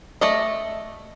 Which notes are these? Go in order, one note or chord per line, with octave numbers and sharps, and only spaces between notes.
A3 D5 D#5